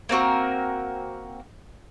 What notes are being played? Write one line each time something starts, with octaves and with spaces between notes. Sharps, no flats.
A#3 C4 F#4 A#4